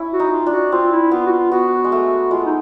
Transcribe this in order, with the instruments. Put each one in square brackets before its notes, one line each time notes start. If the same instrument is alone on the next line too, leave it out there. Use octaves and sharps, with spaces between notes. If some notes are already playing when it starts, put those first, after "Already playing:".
Already playing: [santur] C#4 E4
[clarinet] F#4
[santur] D#4
[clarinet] F4
[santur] D4
[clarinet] F#4
[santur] C4 [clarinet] F4
[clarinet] E4
[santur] B3 [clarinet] F4
[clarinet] F#4
F4
[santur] B3 [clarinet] F#4
[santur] G#3
A3
[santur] G#3 [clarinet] F4
[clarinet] D#4